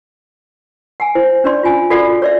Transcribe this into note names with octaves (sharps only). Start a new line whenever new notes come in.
F#5 G#5
E4 C5
C#4 D4 D5 C6
F4 G#5
F4 F#4 A4 D5 F#5
C#5 D5 E5